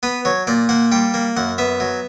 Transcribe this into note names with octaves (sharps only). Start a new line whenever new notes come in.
B3 B4
F#3 C#5
A#2 D5
A#3 F#5
G3 G5
A#3
F#2 F#5
B3 E5
F#3